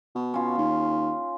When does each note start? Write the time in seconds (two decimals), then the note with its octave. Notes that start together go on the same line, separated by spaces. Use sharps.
0.15 B2
0.34 C#4 F4
0.58 D#2